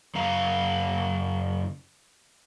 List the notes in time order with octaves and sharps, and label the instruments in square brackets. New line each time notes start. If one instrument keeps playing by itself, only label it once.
[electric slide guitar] F#2 C#3 F5 A#5